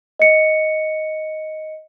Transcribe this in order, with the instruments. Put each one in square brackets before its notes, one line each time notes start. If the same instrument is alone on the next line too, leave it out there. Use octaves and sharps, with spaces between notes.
[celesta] D#5 C#7